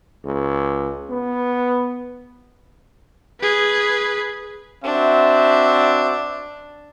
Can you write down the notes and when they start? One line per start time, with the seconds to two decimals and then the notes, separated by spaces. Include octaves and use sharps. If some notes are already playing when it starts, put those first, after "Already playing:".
0.25 C#2
1.10 B3
3.41 G#4 B4
4.84 C4 D4 F#4 E5